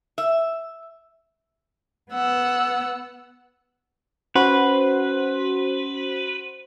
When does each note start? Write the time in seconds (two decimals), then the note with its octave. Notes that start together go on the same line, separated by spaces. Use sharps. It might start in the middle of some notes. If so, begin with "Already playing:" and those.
0.18 E5
2.12 B3 F#5 E6
4.36 C#4 F#4 B4 C5 C6